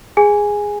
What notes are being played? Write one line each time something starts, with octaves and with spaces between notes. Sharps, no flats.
G#4 G#5